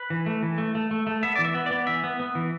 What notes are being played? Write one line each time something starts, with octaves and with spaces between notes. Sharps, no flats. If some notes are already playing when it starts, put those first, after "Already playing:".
Already playing: B4
E3
A3
E3
A3
A3
A3
A3
B3 E5
E3 D5
E5
B3
B3 D5
E3 E5
B3
B3
E3